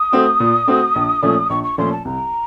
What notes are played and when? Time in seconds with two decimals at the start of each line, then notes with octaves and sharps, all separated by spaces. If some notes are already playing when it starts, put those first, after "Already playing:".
Already playing: D#6
0.12 A3 C4 F#4
0.40 A#2
0.67 A3 C4 F#4
0.95 A#1
1.23 A#2 F3 A3 C#4
1.50 A#1 C#6
1.64 C#6
1.78 A#2 F3 A3 C#4 C6
1.92 A5
2.05 C2 A#5